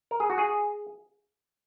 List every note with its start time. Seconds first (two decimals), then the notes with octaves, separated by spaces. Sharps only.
0.11 A#4
0.20 G#4
0.30 F#4
0.38 G#4